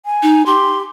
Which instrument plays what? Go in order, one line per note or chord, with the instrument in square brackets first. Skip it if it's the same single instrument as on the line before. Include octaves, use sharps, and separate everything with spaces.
[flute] G#5
[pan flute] D#4
[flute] G4 [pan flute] C6